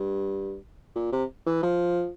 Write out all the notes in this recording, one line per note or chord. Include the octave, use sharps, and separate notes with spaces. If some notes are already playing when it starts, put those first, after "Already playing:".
Already playing: G2
A#2
C3
E3
F3